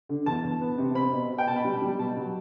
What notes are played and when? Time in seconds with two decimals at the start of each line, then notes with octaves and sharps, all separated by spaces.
0.09 D3
0.26 E2 A5
0.43 E2
0.61 B3
0.78 C3
0.95 C4 B5
1.13 B2
1.29 B2
1.38 G5
1.47 B2 A5
1.56 B5
1.65 G3
1.82 G3
1.99 B2 A5
2.17 F#3